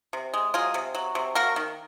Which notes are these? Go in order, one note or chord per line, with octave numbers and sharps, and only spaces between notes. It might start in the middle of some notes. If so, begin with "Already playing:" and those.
C3
G#3
F#3 F4 G#4
C3
F#3
C3
A#3 F#4 A#4
D#3